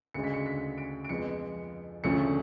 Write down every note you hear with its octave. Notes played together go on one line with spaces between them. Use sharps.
D2 C#3 G#3 C#7
B6
C#7
B6
D7
D7
F2 F3 G#3 B3 C#7
D2 C#3 F3 A3 C#4 C#7